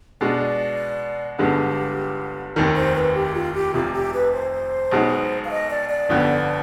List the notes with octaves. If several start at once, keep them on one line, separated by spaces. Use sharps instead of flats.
B2 G#3 D4 D5
G1 G2 D3 G#3 B3 G4
F1 D#2 D#3
C5
B4
G4
F4
G4
F1 F2 C3 F4
G4
B4
C5
B1 B2 G#3 B3 D#4
F5
D#5
D5
D5
G1 F2 D3 F3 B3